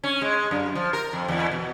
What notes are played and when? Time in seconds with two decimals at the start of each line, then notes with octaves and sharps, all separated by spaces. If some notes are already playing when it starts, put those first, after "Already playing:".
0.04 C#4
0.21 G#3
0.51 F#2
0.75 F3
0.93 A#4
1.13 F2
1.28 E2
1.52 B2